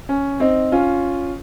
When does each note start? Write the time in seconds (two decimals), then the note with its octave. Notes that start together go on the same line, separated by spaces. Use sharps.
0.09 C#4
0.40 C4 D#4
0.72 C#4 F4